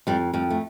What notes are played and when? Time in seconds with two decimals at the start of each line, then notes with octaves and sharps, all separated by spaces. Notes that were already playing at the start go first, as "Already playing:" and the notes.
0.07 F2 G3
0.33 F2 G3
0.50 A3